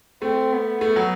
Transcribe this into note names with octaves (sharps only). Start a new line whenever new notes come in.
A3 C4
B3
A3
F#3